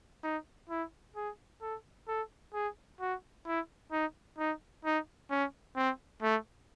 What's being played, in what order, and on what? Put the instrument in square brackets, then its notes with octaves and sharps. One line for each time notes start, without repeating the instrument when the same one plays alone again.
[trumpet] D#4
E4
G#4
A4
A4
G#4
F#4
E4
D#4
D#4
D#4
C#4
C4
A3